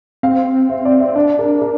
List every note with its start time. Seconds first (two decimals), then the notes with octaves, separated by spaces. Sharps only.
0.23 C4 F5
0.69 E5
0.85 D5
1.00 E5
1.16 D4 D5
1.39 A#4
1.62 A#4